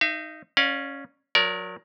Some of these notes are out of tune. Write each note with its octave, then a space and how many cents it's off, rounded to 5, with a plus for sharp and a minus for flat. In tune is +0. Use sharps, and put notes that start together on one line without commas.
D#4 +0 E5 +45
C#4 +0 D5 +30 F5 +25
F#3 -30 A#4 +10 D5 -35